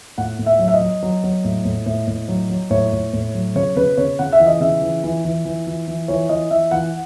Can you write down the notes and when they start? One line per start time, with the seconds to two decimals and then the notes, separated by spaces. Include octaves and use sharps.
0.18 A2 F#5
0.39 A2
0.46 E5
0.59 F#3
0.68 E5
0.74 D#5
0.81 F#3
1.03 F#3
1.24 F#3
1.44 A2
1.65 A2
1.86 A2
2.07 A2
2.28 F#3
2.50 F#3
2.70 A2 C#5
2.93 A2
3.13 A2
3.34 F#3
3.55 C#3 C#5
3.76 C#3 B4
3.97 C#3 C#5
4.19 C#3 F#5
4.32 E5
4.40 E3
4.46 D#5
4.60 C#3 E5
4.82 E3
5.04 E3
5.25 E3
5.45 E3
5.67 E3
5.88 E3
6.08 E3 C#5
6.29 E3 D#5
6.51 E3 E5
6.71 E3 F#5